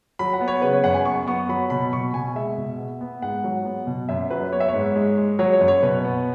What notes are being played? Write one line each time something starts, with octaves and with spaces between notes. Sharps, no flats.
F#3 B5
F#5
B3
C#5
C#3 B4
C#5
F#2 F#5
G#5
B3 C#6
B3 C#6
F#3 B5
B2 B5
B2 C#6
B2 G#5
G#3 E5
B2
B3
B3
G#2 F#5
F#3
B3
B2
F#2 E5
F#3 B4
B3 C#5
E5
C#5
G#2
G#3
G#3
F#3 C#5
C#5
F#2
C#5
B2 B4
B3